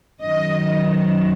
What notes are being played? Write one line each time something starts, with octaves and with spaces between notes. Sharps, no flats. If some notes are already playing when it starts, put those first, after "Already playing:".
F#2 D#3 F#3 D#5